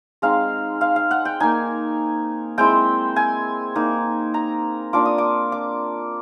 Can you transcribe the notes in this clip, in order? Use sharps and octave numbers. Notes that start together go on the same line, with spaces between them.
G#3 C4 D#4 F5
F5
F5
F#5
G5
A#3 D#4 G#5
G#3 C4 E4 G5
G#5
A#3 D#4
A#5
A#3 D4 F4 D6
D#6
D6
D6